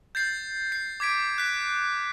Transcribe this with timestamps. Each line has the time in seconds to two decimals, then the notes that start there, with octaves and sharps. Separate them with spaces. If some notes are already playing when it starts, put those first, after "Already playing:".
0.15 G6 A6 C7
0.72 C7
1.00 D6 G#6 B6 D7
1.38 F#6 B6